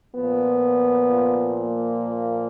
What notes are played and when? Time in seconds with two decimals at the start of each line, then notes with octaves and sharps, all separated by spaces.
0.15 A#2 F3 B3
1.65 A#3